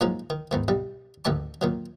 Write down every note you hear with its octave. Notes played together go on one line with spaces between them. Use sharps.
A#2 F3 F#3 G#3 D#4
D#3
E2 G#2 D#3
B1 G3
A1 D2 D#3 E5 A5 D6
A#2 D#3 F#3